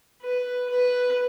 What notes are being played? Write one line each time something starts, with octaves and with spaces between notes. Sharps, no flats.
B4
B4